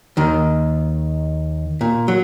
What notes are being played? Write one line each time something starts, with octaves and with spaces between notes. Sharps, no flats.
D#2 D#3
A#2
F#3